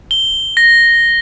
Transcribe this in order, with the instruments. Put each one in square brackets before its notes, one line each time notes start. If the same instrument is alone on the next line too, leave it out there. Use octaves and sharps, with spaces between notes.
[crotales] G7
A#6